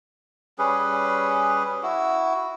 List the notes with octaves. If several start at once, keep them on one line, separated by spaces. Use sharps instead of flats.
G3 C#4 G#4 B4
E4 F#4